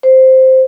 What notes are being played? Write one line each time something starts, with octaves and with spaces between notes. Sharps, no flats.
C5